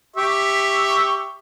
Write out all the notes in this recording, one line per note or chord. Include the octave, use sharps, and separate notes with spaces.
G4 E5 C#6